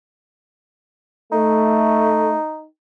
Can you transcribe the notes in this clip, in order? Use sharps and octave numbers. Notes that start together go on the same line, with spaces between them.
A3 D#4